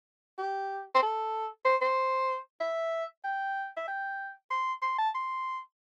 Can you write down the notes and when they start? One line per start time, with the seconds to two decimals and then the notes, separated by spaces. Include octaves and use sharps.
0.38 G4
0.95 C5
1.02 A4
1.65 C5
1.81 C5
2.60 E5
3.24 G5
3.77 E5
3.88 G5
4.51 C6
4.82 C6
4.98 A5
5.14 C6